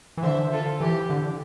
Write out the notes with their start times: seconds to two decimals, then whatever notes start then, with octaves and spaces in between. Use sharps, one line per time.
0.17 E3
0.22 D3 C5 E5
0.51 F4 A4
0.80 E3 G4
1.10 D3